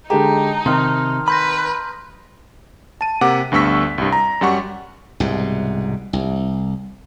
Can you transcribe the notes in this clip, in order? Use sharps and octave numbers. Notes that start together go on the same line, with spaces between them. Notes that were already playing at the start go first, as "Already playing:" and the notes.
D3 G#3 D#4 G4 A5 A#5
C3 D#3 C4 C6 D#6 F6
B4 B5 C6 G6 A#6
A5 D#7
C3 A#3 F#5 D6
D2 G2 B3 C#6 E6 B6
C2 G2
A#5
F#2 G3 F#5 C#6
C2 G#2 B2
C2